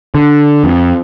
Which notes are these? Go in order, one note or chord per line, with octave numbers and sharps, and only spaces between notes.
D3
F2